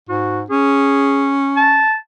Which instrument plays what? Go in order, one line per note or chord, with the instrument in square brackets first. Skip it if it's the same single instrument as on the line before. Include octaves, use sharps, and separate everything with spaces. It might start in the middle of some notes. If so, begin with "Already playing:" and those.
[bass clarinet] G#2 [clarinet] F#4
[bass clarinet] C#4 [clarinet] G#4
[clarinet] A5